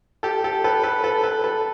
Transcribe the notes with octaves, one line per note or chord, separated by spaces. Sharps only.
G4 A4
G4 A4
A4 B4
A4 B4
A4 B4
A4 B4
A4 B4